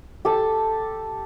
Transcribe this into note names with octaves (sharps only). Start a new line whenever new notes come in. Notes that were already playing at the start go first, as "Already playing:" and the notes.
G4 A4 A5